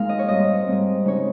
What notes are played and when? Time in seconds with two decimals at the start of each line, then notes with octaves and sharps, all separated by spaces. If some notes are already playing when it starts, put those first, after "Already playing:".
Already playing: A#2 G#3 D#4 F5
0.09 D#5
0.19 C#5
0.28 G#2 G3 C4 D#5
0.67 G#2 G3 C4
1.04 C#3 G#3 D#4 C#5